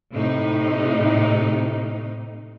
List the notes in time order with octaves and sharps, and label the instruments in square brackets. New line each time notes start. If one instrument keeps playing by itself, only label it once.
[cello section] A2 C3 D#4